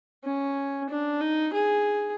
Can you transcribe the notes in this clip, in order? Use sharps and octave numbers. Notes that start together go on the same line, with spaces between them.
C#4
D4
D#4
G#4